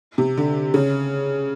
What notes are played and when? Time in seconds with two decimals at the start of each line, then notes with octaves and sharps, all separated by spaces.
0.18 C3
0.37 D3
0.74 C#3